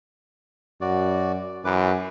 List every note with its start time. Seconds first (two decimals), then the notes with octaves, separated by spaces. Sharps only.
0.81 F#2 F#4 D5
1.65 F#2 E3 B4 D6